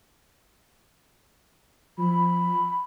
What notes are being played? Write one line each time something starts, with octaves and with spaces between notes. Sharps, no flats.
F3 B5